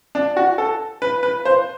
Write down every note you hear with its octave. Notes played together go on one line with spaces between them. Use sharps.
D4
F#4
A4
B4
B4
C5